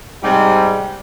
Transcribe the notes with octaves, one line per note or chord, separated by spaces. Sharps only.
G#2 C3 G3